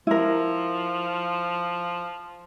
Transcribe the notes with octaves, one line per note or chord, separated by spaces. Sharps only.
F3 E4 A#4